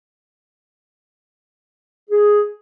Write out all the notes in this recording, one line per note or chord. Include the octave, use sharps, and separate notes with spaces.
G#4